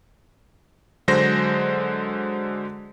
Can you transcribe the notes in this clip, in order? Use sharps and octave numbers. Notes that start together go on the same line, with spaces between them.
D3 F#3 G#3 C5 A#6